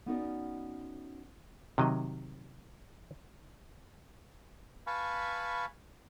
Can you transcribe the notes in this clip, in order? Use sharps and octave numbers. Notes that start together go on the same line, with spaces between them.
B3 C#4 D#4 F#4 A#4 D5
C3 D#3 F#3 D#5
B4 F5 G#5 A5 B5 C#6